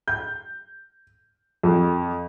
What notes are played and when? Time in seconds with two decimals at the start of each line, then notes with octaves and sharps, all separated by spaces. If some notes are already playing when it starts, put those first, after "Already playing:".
0.08 G6
1.63 F2